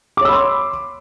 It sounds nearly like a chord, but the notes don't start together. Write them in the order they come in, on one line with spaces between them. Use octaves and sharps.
D6 C#5 E6 B5 C6